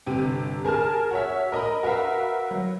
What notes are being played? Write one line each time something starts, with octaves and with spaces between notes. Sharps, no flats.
G1 C3 G5
G#4 A#4 G#5 A5 F6
F#4 C#5 E5
A#4 D#5 A#5 B5
F#4 A#4 B4 E5 F5
F#3